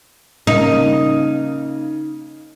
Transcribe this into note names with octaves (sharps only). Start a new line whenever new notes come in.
C#3 A#3 D#4